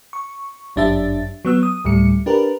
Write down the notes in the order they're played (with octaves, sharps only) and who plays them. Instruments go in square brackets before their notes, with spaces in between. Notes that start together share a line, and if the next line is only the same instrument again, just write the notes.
[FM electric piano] C#6
G1 F#2 D4 G4 E5 A6
F#3 B3 E6
D#6
D2 A2 G3 C#7
D4 G4 A#4 B4